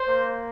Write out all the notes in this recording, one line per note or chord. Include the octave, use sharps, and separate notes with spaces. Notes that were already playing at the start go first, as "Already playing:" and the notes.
Already playing: C5
A#3